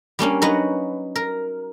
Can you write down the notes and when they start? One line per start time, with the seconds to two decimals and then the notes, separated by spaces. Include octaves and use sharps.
0.19 G3 A#3 C#4 D4
0.42 F#3 D#4 F#4 B4 F#5
1.16 A#4